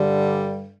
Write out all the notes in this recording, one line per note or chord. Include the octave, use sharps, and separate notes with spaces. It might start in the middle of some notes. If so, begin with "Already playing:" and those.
Already playing: G2 D3 G3